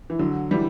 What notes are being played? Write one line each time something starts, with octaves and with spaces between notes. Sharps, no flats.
E3
D3 F#3
E3 G3